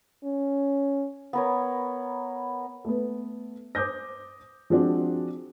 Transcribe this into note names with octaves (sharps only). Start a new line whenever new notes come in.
C#4
B3 A#4 C#5
A3 B3
C5 D6 D#6 G6 A#6
F3 G#3 C4 D4 F#4